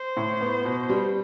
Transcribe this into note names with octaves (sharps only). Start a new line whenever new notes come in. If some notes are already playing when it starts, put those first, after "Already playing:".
Already playing: C5
A2
B3
B2
G3